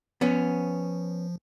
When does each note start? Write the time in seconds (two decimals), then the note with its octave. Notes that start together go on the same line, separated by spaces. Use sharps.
0.21 F3 B3 C#4